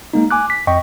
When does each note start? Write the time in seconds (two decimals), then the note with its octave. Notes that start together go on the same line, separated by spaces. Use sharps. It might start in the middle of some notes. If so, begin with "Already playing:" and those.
0.14 G#3 A#3 D#4
0.31 G#5 D6 F#6
0.50 B6
0.67 F2 D#5 G5 C#6